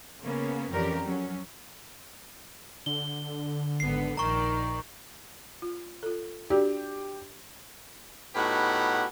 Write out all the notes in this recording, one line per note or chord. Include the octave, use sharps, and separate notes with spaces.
C#3 A#3 B3 C#4
F2 E3 C#4 G4 A#4 D5
F#3 C#4
D3 G7
G#1 B3 C7
A#1 D#3 D5 A#5 C#6
F4
F4 A4
D4 F#4 G4 D5
A2 B3 D#4 F#4 G4 F#5